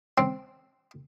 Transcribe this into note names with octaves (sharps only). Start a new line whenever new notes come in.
C4